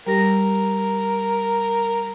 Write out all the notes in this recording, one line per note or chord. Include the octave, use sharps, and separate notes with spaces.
G3 G4 A#4 A#6